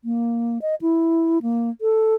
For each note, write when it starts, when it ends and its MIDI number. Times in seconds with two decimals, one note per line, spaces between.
0.05 0.58 58
0.62 0.75 75
0.81 1.39 64
1.42 1.70 58
1.81 2.15 69